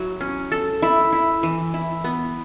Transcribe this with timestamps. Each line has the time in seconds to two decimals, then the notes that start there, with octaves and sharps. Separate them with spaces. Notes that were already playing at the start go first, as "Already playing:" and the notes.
Already playing: F#3 E4
0.21 C#4
0.52 A4
0.82 E4
1.13 E4
1.43 E3
1.74 E4
2.04 B3